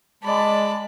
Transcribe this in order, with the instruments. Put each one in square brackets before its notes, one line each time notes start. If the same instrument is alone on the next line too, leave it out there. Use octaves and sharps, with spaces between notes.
[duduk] G#3 [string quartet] D5 A5 B5